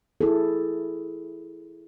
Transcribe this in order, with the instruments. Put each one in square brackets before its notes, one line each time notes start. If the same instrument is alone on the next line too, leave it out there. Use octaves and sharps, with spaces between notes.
[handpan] E4 G#4 A4